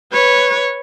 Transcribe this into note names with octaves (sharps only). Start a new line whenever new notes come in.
B4 C#5